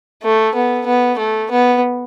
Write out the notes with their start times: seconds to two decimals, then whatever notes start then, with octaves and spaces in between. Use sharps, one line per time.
0.23 A3
0.55 B3
0.86 B3
1.18 A3
1.51 B3